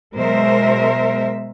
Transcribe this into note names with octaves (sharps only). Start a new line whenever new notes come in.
B2 F#3 G#3 A#4 C5 E5